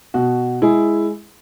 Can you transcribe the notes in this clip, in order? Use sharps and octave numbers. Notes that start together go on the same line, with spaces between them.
B2 F#4
G#3 E4 G#4